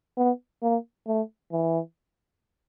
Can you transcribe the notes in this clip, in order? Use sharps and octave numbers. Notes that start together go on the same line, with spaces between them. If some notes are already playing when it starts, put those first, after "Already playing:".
B3
A#3
A3
E3